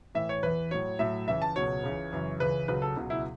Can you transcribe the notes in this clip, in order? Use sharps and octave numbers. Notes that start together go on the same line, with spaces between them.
A2 E3 E5
C#5
E2 E3 B4
A2 F#3 C#5
A2 F#3 E5
C#2 C#3 E3 E5
A5
C#2 B2 F#3 C#5
C#2 C#3 E3
F#2 C#3 E3
C#2 C#3 E3 B4
C#2 C#3 F#3 B4
A4
C#2 B2 F#3
E4